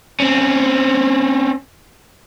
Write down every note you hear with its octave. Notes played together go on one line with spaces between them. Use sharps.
C4 C#4